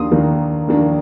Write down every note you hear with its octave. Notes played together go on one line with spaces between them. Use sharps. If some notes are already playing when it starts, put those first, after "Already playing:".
Already playing: D#2 D#3 A#3 D4 C6 D#6
D#2 D#3 A#3 D4
D#2 D#3 A#3 D4